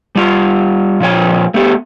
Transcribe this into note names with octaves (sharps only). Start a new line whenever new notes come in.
G3 F4
A#2 F3 C#5 G5
A3 B3 G4